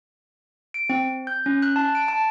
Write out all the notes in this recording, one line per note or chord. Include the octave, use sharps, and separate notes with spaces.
D7
C4
G6
C#4
F#6
A5
D7
A5